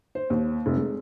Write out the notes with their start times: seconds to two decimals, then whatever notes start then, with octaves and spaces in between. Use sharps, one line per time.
0.15 C5
0.30 D#2
0.66 F1
0.77 G#3